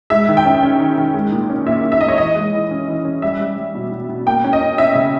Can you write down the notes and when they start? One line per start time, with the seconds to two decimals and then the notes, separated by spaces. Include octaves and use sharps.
0.10 G#3 E5
0.28 D#3
0.37 G5
0.45 C#4
0.63 C#4
0.80 D#3
0.98 D#3
1.14 G#3
1.32 A#2
1.50 C#4
1.66 A#2 E5
1.84 A#2
1.92 E5
2.01 A#2 D#5
2.08 C#5
2.18 E3 D#5
2.36 G#3
2.53 E3
2.71 C#4
2.88 E3
3.05 C#4
3.22 G3 E5
3.40 G3
3.56 G3
3.75 B2
3.92 B2
4.09 B2
4.26 A#3 G5
4.44 C#4
4.53 D#5
4.61 C#4
4.78 C#4 E5
4.95 C#3